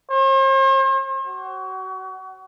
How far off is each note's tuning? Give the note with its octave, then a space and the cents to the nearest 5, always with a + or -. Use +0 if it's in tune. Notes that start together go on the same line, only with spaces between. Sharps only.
C5 +45
F#4 +30